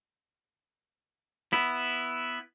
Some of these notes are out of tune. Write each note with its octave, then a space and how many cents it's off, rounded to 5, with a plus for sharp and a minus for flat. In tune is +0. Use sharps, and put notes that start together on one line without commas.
B3 +0 E4 +0